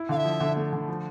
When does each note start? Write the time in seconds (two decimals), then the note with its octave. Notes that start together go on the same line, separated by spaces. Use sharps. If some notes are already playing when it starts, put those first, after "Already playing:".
Already playing: E4
0.09 D3 F5
0.16 E5
0.24 F3
0.40 D3
0.56 A3
0.73 D3
0.88 F3